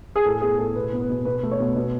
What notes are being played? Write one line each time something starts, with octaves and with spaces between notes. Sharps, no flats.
G#4
A2 A4
B3 G#4
A2 A4
B2 B4
B3
B4
B2
B2 B4
A3
C#5
B2
B2